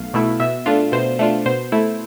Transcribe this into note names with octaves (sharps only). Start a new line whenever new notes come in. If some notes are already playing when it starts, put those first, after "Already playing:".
Already playing: B1 A3 F5
B2 A3 E4
B2 E5
A3 D4 F4
B2 C5
A3 D4 F4
B2 C5
A3 E4